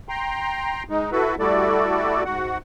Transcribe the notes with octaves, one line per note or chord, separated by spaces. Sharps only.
G5 A#5 C6
G#3 D#4
E4 F#4 A4 B4
G3 A3 E4 F#4 A4 D5
G#2 F#4 F#5